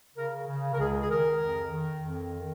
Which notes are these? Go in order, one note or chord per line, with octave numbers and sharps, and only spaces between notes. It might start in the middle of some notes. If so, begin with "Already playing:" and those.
C#3 A#4
C#3
A#4
C#2 G#4
G#4
D#3 A#4
F2
D#3
F2
D#3